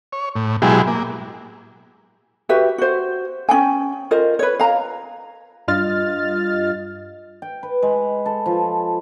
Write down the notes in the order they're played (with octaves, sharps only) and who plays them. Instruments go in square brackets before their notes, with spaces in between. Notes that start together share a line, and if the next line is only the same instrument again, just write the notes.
[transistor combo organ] C#5
A2
B2 F#3 G#3 E4 G4 G#4
A#3
[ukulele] F#4 G4 B4 E5
F#4 C5
C#4 D4 G5 G#5
F4 A#4 C5 D#5
B4 C#5
F5 A#5
[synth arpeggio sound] G2 F4 D#5 F6 A6
[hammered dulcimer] G5
B4
G#3
A4
F3